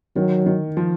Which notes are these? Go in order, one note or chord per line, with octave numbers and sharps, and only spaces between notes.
D#3 F#3
D#3
F3